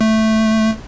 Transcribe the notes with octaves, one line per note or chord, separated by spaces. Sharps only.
A3